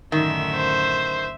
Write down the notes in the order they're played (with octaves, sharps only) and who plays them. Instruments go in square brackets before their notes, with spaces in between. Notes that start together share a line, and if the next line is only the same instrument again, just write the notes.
[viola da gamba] F#2 A2 D3 [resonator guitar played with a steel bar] D#3 [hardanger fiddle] E5
[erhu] C5